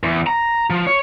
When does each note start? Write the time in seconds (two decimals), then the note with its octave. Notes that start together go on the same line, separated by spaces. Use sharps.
0.03 E2
0.27 A#5
0.70 F3
0.87 C#5